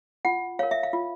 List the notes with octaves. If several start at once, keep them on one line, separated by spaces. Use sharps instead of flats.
F4 F#5
A#4 C#5 F5
E5
F5
F4